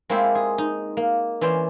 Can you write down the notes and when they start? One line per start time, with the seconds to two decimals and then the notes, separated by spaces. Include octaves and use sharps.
0.10 G#3 A#3 C4 E4 F4 G4
0.35 G#4
0.58 D#4
0.97 A#3
1.41 E3 C#4 C5 D5 C6